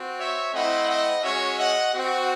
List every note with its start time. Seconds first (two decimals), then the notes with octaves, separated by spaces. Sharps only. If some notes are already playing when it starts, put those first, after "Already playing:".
Already playing: C4 F#4
0.18 C#5 E5
0.53 A3 C4 E4 D#5 F#5
0.88 D#5 F#5
1.23 G#3 C#4 F#4 C#5 E5
1.57 D#5 F#5
1.93 C4 F#4